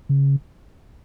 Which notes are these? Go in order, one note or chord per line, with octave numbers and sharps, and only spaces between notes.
C#3